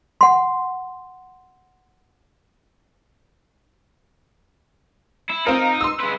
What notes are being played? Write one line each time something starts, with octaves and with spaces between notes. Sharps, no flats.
F#5 C6
E4
C4 D#4 F4 A#4
C6 E6
G#3 B4